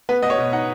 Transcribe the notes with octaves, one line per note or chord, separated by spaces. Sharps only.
B3 B4
B3 D#5
C#5
B2
D#4 F#5